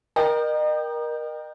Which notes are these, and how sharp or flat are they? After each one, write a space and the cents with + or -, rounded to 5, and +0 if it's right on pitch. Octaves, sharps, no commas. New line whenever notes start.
A#4 +20 D#5 -35 G5 +0